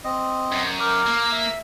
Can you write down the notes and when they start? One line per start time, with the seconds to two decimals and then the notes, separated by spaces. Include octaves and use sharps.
0.04 C4 D#5
0.52 F#2
0.80 A#4 D6
1.07 A#3
1.32 E5